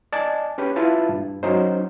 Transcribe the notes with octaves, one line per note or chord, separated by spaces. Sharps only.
D5 D#5 G#5 A5
C#4 G4 B4
E4 F4 B4 A5
G2
F#3 C#4 D#4 C5